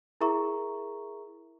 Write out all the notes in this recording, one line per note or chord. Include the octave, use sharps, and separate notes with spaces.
E4 G#4 A#4 E5 A#5 C#6